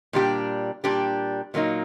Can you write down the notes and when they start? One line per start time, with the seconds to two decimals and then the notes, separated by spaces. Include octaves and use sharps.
0.13 A#2 G3 D4 G4
0.84 A#2 G3 D4 G4
1.54 A#2 F#3 A#3 D#4